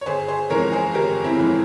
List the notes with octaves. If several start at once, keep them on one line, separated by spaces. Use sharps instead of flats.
C#5
G1 G#4 C5
G#4 C5
F2 C#3 E3 G#3 A#4 C#5
G#4 C5
G1 G4 A#4
C4 E4
F2 C#3 E3 G#3